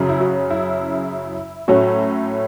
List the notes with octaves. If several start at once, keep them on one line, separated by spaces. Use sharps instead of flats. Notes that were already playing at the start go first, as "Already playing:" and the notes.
Already playing: F#2 C#3 F#3 C#4
E4
F#4
E4
A2 F#3 A3 C#4 F#4